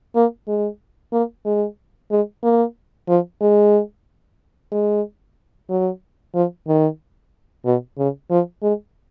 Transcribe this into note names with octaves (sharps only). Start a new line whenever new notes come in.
A#3
G#3
A#3
G#3
G#3
A#3
F3
G#3
G#3
F#3
F3
D#3
B2
C#3
F3
G#3